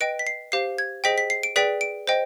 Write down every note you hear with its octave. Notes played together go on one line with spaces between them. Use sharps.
B4 D#5 G5 D7
B6
C7
G4 C5 F5 C7
G#6
G#4 C5 D#5 G5 B6
B6
C7
D7
G#4 B4 D5 G5 B6
D7
C5 D#5 G5